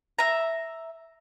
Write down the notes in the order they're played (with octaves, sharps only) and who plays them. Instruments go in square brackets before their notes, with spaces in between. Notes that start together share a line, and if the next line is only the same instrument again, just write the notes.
[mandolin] E5 A#5